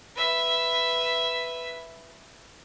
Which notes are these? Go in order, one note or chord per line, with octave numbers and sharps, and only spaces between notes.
B4 E5